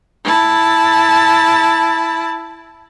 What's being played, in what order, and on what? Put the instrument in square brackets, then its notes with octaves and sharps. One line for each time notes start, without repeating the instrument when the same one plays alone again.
[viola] E4 A5